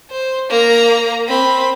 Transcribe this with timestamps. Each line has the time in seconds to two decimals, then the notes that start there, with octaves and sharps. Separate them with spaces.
0.11 C5
0.50 A#3 A#5
1.28 C4 B5